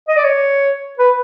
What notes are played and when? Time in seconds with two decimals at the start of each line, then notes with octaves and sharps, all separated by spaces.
0.08 D#5
0.17 D5
0.24 C#5
0.99 B4